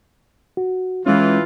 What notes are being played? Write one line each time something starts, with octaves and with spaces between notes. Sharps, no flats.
F#4
E3 G#3 C#4 F4